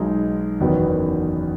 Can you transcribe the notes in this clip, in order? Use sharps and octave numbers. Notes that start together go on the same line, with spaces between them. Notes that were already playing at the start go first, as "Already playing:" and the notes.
Already playing: B1 B2 G#3 D#4
F#1 E2 D#3 F#3 B3